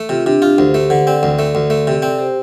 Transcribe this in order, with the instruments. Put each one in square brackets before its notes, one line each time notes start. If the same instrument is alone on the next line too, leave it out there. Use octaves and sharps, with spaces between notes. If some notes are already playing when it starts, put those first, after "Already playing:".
Already playing: [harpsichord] A3
[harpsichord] C3 [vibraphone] F4
[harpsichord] C3 [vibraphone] D4 G4
[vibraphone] D4 G4 [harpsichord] F4
[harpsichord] D2 [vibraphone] G4 C5
[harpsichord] A3
D3
[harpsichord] C4 [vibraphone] A4 D5
[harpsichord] D2
A3
D2
A3
C3
[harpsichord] C4 [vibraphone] A4 D5
[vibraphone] G4 C5